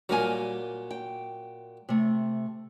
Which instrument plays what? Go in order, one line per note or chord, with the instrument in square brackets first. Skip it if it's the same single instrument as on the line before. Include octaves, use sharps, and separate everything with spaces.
[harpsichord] A#2 F#3 [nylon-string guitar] G3 A#4 G#5
[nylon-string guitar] G5
C3 A3